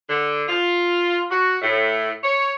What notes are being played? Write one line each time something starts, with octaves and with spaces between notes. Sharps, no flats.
D3
F4
F#4
A2
C#5